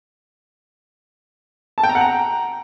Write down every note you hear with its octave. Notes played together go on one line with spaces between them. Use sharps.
A5
G5
A#5
F#5
A#5